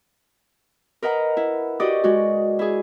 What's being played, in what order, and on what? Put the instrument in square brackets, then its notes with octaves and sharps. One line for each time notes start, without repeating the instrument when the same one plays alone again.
[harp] A#4 B4 D#5 F#5 A#5
E4
F#4 G4 D5 D#5 D#6
G#3 F#4
E4 G#4